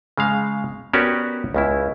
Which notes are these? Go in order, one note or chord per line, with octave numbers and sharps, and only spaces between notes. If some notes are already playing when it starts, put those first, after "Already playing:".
C#3 G#3 F5
B3 C#4 F#4 G4 A#4 D5
C#2 C#3 E4